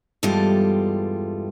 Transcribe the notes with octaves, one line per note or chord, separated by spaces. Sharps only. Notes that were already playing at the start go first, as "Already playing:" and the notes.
E2 G2 G3 G#3 F4 A4